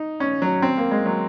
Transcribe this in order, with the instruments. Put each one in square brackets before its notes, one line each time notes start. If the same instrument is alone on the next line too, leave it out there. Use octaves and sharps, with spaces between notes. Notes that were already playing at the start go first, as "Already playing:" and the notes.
Already playing: [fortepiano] D#4
C#4
F#3
C4
A#3
G#3
F#3